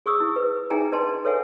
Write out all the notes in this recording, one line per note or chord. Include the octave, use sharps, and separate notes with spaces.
G#4 C#6 D#6 E6
E4
B4
D#4 G#4 E5 G5 G#5 A#5
D4 B4 D#5 A5 C6
A4 B4 C#5 E5 F#5 G#5